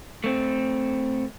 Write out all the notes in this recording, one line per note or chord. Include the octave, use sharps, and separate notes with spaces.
A3 C4